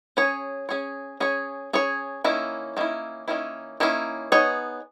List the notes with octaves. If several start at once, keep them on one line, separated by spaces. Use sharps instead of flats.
C#4 G#4 C#5
C#4 G#4 C#5
C#4 G#4 C#5
C#4 G#4 C#5
D#3 A#3 C#4 E4
D#3 A#3 C#4 E4
D#3 A#3 C#4 E4
D#3 A#3 C#4 E4
B3 D#4 G#4 C#5